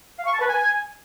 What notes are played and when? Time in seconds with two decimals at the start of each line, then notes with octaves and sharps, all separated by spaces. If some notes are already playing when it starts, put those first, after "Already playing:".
0.19 F5
0.26 C#6
0.34 A5
0.41 B4
0.48 G#5